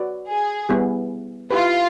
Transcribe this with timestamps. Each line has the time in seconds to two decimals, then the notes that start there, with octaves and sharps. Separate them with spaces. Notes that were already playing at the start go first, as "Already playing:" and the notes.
Already playing: F#4 B4 D5
0.28 G#4
0.69 G3 B3 E4 G#4
1.51 E4 F4 G4 B4